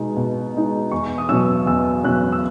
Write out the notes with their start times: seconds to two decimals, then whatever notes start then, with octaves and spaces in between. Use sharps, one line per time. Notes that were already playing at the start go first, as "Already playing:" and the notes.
Already playing: B2 G#3 D#4
0.16 B2
0.55 G#3 D#4
0.92 E2 C#6
1.18 D#6
1.29 B2 F#3 C#4 E6
1.66 E2 E6
2.04 B2 F#3 C#4 F#6
2.32 E6